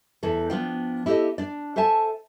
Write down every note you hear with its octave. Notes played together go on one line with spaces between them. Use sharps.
E2 E3 A4
F3 B3 D4 F4 D5 G5
E4 G4 A4 C5 D#5
D4 D5
A4 C5 E5 G#5 A5